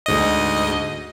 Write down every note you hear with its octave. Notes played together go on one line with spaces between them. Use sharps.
D2 G#2 D#5